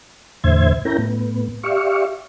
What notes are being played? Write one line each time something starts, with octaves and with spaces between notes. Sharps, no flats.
E2 A2 D3 C5 E5 G#6
C#4 E4 A#4 G5 A#5
A2 B3
G4 D5 E5 F5 C#6